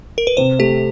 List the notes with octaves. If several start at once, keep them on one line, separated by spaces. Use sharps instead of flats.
A#4
B4
C3 C5
A3 G4